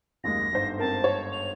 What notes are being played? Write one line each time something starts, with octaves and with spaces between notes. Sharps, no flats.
F#1 D#2 G#3 A#6
G1 G#2 C5
C4 A#4 A5
C#5
F7